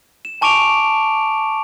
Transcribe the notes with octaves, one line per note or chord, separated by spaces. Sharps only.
E7
G#5 A5 C#6 D6 D7 F7